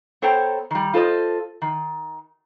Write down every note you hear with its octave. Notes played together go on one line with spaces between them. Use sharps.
B3 A4 C5 C#5 G5 A#5
D#3 G3
F4 A4 C5 C#5 D#5
D#3